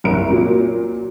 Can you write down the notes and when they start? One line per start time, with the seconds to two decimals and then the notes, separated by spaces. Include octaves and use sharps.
0.04 F#1 C2 D7
0.29 A#2 F#3 A#3